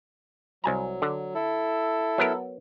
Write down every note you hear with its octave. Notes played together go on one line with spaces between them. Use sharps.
C2 F#3 G#5 A#5
D3
E4 A4
F#3 B3 A#4